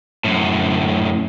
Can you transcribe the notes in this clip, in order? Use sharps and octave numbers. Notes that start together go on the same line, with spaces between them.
F#2 A2